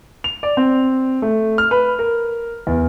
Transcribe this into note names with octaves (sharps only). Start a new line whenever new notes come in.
F7
D5
C4
A3
F6
B4
A#4
E2